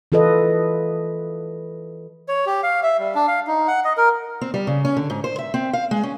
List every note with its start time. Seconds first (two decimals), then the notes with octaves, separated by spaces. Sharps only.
0.12 E3 F4 A4 B4 D#5
2.28 C#5
2.46 G4
2.63 F5
2.83 E5
2.99 G3
3.15 D4
3.28 F5
3.47 D#4
3.68 F#5
3.84 D#5
3.97 A#4
4.41 C4
4.54 G3
4.67 C#3
4.85 C#4
4.96 D3
5.10 G#2
5.24 C5
5.39 E5
5.54 C4
5.73 F5
5.91 G#3
6.03 C#4